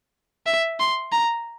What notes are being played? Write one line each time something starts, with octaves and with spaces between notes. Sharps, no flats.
E5
C6
A#5